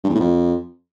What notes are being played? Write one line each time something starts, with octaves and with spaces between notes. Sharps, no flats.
G2
E2
A2
F2